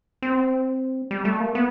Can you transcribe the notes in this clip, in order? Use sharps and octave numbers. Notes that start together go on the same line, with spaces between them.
C4
G3
A3
A#3
B3